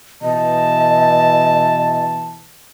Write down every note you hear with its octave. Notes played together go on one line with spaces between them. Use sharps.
B2 E3 D#5 A5